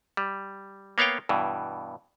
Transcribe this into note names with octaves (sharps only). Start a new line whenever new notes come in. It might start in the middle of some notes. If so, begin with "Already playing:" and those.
G3
A#3 B3 C#5 F5 G5
G2 B2 E3